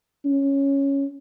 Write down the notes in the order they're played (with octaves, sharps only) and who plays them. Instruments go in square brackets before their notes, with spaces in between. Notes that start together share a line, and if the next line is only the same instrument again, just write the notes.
[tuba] C#4